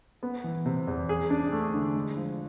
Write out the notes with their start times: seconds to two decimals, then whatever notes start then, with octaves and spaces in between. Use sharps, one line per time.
0.23 B3
0.44 E3
0.66 C3
0.87 E2
1.09 G#4
1.30 D4
1.52 A3
1.74 D3
1.95 G#3
2.17 F3